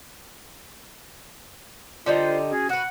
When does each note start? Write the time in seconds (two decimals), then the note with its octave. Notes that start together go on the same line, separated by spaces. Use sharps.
2.06 D3 G3 D#4 F4 C5
2.51 C#4 F#4 G#4
2.69 F#4 B4 F#5